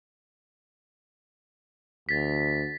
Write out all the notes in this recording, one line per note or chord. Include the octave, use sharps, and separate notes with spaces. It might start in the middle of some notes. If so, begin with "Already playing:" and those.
D2 A6 B6